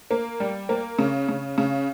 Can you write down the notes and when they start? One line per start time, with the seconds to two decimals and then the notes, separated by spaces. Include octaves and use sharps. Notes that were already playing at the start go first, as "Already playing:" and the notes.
0.11 A#3
0.40 G3
0.69 A#3
0.99 C#3
1.29 C#3
1.58 C#3